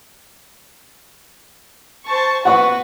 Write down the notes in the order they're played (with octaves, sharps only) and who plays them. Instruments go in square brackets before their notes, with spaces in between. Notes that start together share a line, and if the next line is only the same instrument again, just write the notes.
[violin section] C5 A5 C#6
[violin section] B3 F#4 B4 [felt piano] F#5 C#6